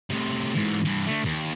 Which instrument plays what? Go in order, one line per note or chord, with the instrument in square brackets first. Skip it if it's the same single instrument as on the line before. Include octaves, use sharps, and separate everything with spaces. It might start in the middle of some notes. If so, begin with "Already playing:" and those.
[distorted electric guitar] A2 C3
G#2 E3
G2 E3
D3 A3
D#2